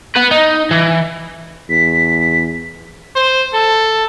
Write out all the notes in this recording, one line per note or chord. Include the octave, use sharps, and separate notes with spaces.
B4 F#5
D#4
E3
E2 B6
C5
A4